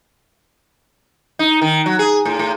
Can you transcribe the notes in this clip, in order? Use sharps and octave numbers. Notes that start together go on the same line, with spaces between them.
D#4
D#3
F#3
G#4
A2
A2